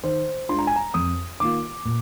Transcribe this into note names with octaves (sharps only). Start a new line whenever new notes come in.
D#3 C5
G#3 D4 F4 C6
A#5
G#5
A#5
F2 D#6
D#3 A#3 F4 D6
A#2